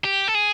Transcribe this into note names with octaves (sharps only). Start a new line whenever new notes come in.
G4
A4
G#4